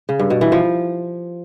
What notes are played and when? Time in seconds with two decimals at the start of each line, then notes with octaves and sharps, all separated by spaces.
0.09 C#3
0.20 G2
0.30 B2
0.41 E3
0.52 F3